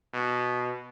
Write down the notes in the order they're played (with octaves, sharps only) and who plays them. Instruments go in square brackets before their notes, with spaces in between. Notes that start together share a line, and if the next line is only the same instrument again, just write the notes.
[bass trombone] B2